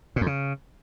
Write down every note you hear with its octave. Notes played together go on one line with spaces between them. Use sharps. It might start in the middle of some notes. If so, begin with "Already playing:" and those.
A#2
F2
C#3